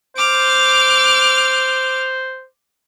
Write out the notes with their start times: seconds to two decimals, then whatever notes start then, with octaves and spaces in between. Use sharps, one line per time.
0.17 C5 D6 F6